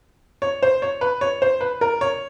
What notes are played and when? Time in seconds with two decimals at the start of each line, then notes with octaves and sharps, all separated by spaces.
0.42 C#5
0.62 C5
0.82 C#5
1.01 B4
1.21 C#5
1.42 C5
1.61 B4
1.81 A#4
2.01 C#5